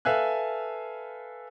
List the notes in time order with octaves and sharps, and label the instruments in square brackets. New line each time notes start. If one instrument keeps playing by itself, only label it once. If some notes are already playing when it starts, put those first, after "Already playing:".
[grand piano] A4 B4 E5 F5 G#5 F#6